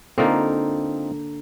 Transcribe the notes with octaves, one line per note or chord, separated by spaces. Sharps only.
D3 A#3 C4 D#4 F4